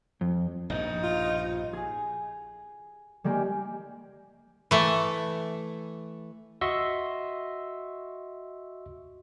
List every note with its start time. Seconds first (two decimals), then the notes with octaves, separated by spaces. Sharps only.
0.21 F2
0.70 A#1 G2 B2 D#4
1.03 F4
1.73 G#4
3.24 G3 G#3 A#3 G4
4.71 E3 A3
6.61 F#4 D#5 E5 C6 C#6 E6